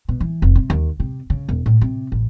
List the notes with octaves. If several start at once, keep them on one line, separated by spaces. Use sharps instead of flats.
B2
E3
F1
C3
D#2
C3
C#3
E1
A2
C3
A1